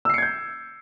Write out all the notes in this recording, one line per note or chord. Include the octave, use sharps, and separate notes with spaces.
E6 G6 G#6 C7 C#7